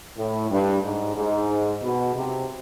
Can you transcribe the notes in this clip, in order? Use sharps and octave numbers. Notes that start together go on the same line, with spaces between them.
A2
G2
G#2
G#2
B2
C3